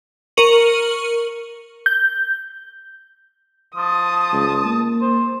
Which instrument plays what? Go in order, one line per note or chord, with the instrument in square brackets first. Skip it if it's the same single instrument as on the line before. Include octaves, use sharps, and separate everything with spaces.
[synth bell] A#4 C#6 C#7 D#7 F#7
[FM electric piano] G6
[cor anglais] F3 [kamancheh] A5 D#6
[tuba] C#2
A#3
[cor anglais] C5